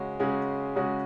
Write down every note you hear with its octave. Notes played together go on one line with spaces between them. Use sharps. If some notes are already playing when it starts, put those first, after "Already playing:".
Already playing: C#3 G#3 C#4 F#4
C#3 G#3 C#4 F#4
C#3 G#3 C#4 F#4